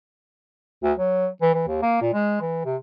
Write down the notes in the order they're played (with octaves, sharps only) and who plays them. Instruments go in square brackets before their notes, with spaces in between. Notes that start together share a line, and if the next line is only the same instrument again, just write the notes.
[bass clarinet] D2
F#3
E3
E3
D#2
A#3
A#2
G#3
E3
C3